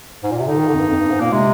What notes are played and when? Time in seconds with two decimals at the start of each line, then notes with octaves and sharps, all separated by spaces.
0.24 G#2
0.32 A#2
0.39 C3
0.47 D3 D#4
0.58 D#3
0.68 D3
0.74 F2
0.79 G2
0.90 F2
1.00 G2
1.11 G#2
1.20 A#2 A#3
1.32 C3 G#3